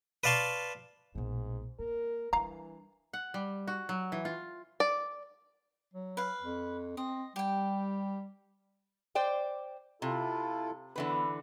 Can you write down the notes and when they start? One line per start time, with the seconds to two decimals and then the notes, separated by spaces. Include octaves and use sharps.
0.24 B4 D5 F5 A5 C6 C#6
1.15 A#1 G#2 B2
1.79 A#3 A#4
2.33 E3 G3 D4 F5 A#5
3.13 F#5
3.34 G3
3.67 F#4
3.89 F#3
4.12 E3
4.25 F4
4.80 D5
5.94 F#3
6.17 B4 F5
6.42 F2
6.97 C4 D#5
7.36 G3 G4 G5
9.15 C5 D5 G5
10.02 C3 E4 F4 A4
10.96 D3 E3 B3 B4